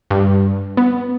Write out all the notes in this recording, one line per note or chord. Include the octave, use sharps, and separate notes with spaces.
G2
B3